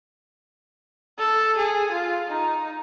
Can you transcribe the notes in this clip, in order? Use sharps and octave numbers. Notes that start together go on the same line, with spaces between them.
A4
G#4
F4
D#4